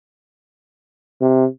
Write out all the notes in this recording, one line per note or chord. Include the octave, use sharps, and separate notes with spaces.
C3